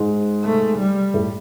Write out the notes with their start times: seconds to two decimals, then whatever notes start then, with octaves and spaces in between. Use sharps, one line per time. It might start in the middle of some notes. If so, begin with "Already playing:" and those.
Already playing: G#2 G#3
0.44 A3
0.78 G3
1.14 A2 A3